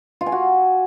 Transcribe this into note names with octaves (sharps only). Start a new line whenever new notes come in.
F4
G#5
F#4